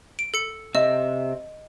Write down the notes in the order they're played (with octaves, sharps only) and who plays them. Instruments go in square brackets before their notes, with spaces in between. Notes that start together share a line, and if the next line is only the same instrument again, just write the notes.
[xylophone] D7
A4 C#7
[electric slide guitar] C3 E5 [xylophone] D#5